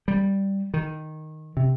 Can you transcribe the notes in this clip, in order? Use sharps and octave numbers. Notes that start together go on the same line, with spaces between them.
G3
D#3
C3